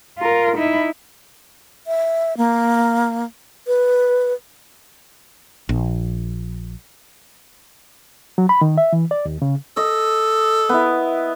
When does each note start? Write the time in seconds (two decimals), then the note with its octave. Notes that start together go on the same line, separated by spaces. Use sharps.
0.19 F4 A#4
0.57 D#4 E4
1.87 E5
2.37 A#3
3.67 B4
5.69 A#1
8.38 F#3
8.49 B5
8.61 D#3
8.78 E5
8.93 E3
9.11 D5
9.25 D#2
9.42 C#3
9.77 A4 D#5
10.69 B3 E4